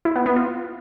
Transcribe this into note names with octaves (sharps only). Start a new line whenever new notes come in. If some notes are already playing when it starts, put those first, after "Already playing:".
E4
B3
B3
F4